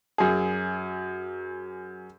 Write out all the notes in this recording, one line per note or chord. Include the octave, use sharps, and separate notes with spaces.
F#2 G#4